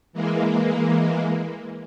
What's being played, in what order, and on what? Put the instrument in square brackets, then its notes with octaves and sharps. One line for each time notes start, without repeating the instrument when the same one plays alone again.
[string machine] E3 G#3 A#3